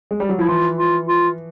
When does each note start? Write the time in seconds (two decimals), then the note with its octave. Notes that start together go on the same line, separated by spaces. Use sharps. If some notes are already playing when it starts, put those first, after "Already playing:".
0.11 G#3
0.20 G3
0.29 F#3
0.39 F3 E4
0.48 E3 F4
0.77 F4
1.08 F4